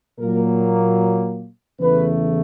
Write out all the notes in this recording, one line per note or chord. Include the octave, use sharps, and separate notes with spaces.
A#2 F#3 A#3 A#4
E2 C#3 E3 A3 B4